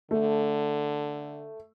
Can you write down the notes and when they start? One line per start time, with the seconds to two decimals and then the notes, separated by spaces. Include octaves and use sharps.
0.11 D3 A3